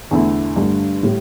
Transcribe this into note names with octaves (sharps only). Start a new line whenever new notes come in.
E2 D3 A3 E4
G2 D3 A3
A2 G3